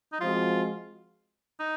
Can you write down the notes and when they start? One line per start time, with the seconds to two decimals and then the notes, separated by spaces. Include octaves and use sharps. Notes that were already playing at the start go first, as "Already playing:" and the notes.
0.13 D#4
0.20 F3 G#3 C4 F4 F#4
1.59 D#4